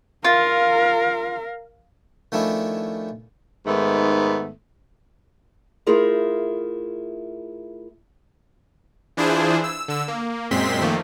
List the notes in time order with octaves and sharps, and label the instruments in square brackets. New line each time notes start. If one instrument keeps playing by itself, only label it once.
[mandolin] F4 [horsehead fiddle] A#4 F5
[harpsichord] D#3 F3 A3 C#4 D4 E4
[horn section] G#2 D#3 A3 B3
[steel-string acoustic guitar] A3 E4 F4 G#4 A#4
[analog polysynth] E3 D4 E4 F4 G#4 C5
E6
D3 E6
A#3
F#2 A#2 G#3 C4 C6 B6
D#3 F3 A3 A#3